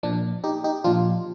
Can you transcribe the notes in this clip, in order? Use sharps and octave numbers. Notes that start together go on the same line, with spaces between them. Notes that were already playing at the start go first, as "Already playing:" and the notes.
A#2 F3 D4
D#4 G4
D#4 G4
A#2 F3 D4 F4